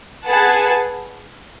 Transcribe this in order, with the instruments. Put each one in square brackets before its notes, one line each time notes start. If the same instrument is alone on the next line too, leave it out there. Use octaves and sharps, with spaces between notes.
[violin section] G#4 B4 F#5 A5